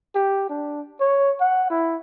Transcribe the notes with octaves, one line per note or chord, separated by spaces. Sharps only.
G4
D4
C#5
F#5
E4